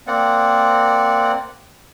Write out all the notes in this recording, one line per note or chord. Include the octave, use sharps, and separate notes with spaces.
A#3 C4 D5 F#5